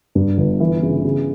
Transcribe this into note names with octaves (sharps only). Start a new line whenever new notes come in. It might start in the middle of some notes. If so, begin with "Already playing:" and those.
G2
G1
E3
C#3
C#3